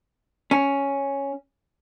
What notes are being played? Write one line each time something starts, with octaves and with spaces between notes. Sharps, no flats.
C#4